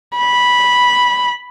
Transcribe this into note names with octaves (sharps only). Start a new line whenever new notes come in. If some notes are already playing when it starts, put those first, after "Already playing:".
B5